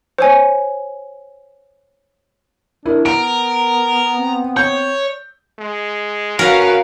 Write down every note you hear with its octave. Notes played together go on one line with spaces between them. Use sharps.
C5 C#5 G#5
D4 E4 A#4
B3 A#4 A#5 D7
C4
C#5 G6
G#3
C#4 F#4 A#4 B4 F5